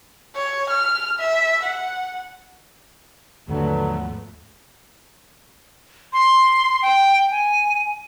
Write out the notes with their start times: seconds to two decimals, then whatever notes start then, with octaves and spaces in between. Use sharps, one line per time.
0.35 C#5
0.70 F6
1.20 E5
1.63 F#5
3.48 D#2 G#2 D3 F3 F#3 A3 B3
6.13 C6
6.82 G5
7.31 G#5